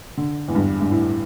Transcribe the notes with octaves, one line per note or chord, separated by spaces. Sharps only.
D3
E2
G2
G2
A2